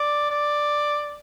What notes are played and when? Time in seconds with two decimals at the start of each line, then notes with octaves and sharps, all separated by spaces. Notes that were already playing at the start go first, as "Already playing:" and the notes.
Already playing: D5
0.31 D5